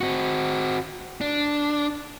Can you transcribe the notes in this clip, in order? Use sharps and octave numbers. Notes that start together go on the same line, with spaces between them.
C4 F#4
D4